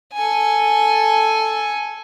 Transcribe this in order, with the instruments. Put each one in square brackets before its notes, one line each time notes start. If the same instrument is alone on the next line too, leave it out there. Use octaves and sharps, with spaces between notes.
[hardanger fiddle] A4 G#5